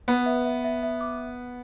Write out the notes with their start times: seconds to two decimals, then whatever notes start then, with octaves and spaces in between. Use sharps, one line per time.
0.08 B3 B4
0.26 E5
0.45 E5
0.64 E5
0.83 E5
1.01 D6